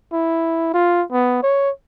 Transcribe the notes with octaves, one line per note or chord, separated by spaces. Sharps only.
E4
F4
B3
C#5